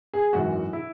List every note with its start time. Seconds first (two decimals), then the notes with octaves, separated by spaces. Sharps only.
0.13 G#4
0.33 G#1 F#2 E3 F#4
0.73 E4